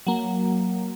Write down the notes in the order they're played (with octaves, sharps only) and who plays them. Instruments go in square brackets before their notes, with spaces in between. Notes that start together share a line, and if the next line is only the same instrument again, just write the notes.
[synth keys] F#3 A#3